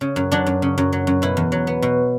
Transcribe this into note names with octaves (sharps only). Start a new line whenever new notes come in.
C#3
F#2
F#3 D4
F#2
C#3
F#2
F#3
F#2
B2 E4
E2
F#3
B3
B2